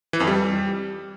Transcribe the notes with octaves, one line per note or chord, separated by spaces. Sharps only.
E3
F2
G3